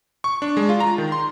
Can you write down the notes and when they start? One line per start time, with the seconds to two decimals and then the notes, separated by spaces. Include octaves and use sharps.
0.24 C#6
0.42 D4
0.57 G#3
0.69 F4
0.80 A#5
0.98 D#3
1.12 C6